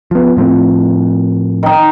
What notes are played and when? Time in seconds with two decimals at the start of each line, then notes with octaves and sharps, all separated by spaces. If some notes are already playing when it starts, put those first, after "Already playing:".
0.11 F3 B3
0.37 A2 F3 C4
1.63 D#3 D#4